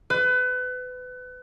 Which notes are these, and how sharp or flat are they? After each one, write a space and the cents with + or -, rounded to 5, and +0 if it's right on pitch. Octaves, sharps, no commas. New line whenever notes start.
B4 +30